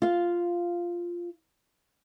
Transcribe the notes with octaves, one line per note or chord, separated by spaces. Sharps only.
F4 F5